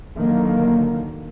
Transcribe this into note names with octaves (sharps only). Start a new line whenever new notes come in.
D3 D#3 F#3 A#3